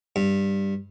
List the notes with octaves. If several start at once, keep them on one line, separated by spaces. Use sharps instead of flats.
G2